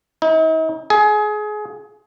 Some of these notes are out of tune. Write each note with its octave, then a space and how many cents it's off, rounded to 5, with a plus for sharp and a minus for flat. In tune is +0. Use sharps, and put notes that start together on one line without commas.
D#4 +45
G#4 +25